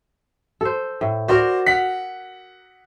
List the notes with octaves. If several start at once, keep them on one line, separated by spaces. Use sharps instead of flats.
A4 C5
A2
F#4 A#4 C5 D5
F5 F#5 F#6 B6